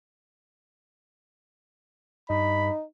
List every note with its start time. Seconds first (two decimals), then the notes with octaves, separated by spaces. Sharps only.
2.30 G2 D#4 B5